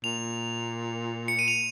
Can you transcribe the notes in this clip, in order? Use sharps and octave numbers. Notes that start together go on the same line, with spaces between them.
A#2 F7
C#7
D#7
F7